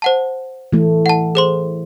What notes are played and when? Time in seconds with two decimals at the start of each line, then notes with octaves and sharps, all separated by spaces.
0.02 C5 F#5 A5
0.73 E3 A3
1.06 F#5 A5
1.35 G#4 C5 C6